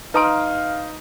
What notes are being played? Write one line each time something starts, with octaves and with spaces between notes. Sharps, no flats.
D#4 B4 F5 A#5 C6 D#6 D7